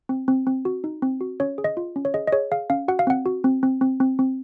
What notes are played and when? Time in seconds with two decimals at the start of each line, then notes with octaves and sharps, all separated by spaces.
0.09 C4
0.28 C4
0.47 C4
0.65 F#4
0.84 D#4
1.02 C4
1.21 F#4
1.40 C#4 C#5
1.58 G#4
1.64 D#5
1.77 F4
1.96 C#4
2.05 C#5
2.14 G#4 D#5
2.27 D#5
2.32 G#4 C#5
2.52 G#4 F5
2.70 C#4 F5
2.88 F#4 F#5
2.99 F5
3.07 C4 F#5
3.26 F#4
3.44 C4
3.63 C4
3.81 C4
4.00 C4
4.19 C4